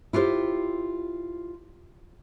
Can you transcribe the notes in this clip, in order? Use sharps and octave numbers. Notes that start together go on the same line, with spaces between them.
E4 F4 G4 A#4 C5